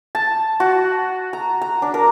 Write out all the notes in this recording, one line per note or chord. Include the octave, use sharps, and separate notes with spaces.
A5
F#4
A#5
A#5
D4
A#4